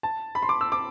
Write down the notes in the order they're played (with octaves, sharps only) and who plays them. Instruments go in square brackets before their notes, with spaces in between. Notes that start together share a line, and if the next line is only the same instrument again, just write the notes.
[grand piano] A5
B5
C6
D6
E6
D6